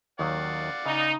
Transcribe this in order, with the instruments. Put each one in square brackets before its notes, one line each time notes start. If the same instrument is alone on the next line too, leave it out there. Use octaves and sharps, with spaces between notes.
[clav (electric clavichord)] D#2 D#3 F#3 [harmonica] D5 F5 F#5
[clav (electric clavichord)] C#3 [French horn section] D#4